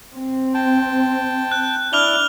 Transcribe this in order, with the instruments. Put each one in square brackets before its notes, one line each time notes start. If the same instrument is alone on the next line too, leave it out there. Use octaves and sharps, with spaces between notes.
[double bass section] C4
[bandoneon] G5 A5
[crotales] F#6
[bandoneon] D4 E4 D5 [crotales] F6 F7 G7